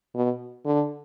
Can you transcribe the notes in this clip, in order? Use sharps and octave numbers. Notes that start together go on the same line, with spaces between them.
B2
D3